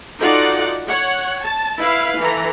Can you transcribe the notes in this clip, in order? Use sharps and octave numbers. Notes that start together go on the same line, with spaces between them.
D#4 F4 F#4 A4 D5 F#5
C#5 F#5
A5
E4 B4 F5
E3 A4 A#5